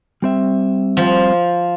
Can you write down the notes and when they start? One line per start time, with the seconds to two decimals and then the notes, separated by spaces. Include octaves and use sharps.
0.22 G3 C4 E5
0.97 F3